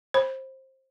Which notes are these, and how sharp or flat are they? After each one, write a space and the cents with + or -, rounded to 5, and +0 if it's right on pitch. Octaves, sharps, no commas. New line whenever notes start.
C5 +20 B5 +0